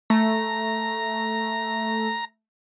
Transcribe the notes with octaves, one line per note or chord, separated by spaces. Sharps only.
A3 A#5